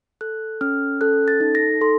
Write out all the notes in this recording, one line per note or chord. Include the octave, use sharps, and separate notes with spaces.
A4 F#6
C#4 F6
A4 F#6
A6
D#4
A#6
A4 C6